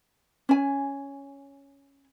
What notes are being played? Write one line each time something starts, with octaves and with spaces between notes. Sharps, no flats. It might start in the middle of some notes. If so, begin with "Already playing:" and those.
C#4 G#5